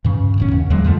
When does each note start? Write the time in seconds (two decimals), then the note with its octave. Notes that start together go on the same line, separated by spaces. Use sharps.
0.04 G2 C#3
0.38 D1 A1 C#4
0.52 D#2
0.70 D2 D3 F#3 G#3
0.84 F2 F3 A3